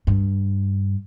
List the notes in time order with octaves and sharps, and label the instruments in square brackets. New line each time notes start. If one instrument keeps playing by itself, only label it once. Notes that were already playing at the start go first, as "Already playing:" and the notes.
[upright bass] G2